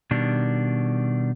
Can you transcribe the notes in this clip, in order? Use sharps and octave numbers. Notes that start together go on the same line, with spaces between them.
B2 D#3 G3 D4